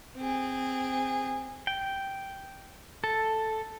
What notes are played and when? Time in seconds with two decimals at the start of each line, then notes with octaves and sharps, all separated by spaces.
0.16 C4 G#4
1.67 G5
3.04 A4